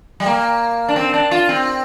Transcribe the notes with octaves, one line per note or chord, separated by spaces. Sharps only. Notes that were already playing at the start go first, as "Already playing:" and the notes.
G3
A#3
D4
C4
D4
F4
C4